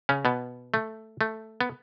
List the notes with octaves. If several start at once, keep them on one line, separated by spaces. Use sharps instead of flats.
C#3 C#4
B2 B3
A3
A3
B3